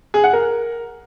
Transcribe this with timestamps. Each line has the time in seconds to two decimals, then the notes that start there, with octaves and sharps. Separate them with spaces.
0.14 G#4
0.24 F#5
0.33 A#4